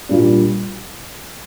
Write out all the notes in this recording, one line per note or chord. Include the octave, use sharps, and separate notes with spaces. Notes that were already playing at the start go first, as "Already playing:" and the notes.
A#2 G3 D4